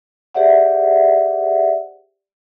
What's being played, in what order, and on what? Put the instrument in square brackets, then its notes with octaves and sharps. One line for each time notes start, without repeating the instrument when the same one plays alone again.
[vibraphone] G4 G#4 C5 D5 E5 F#5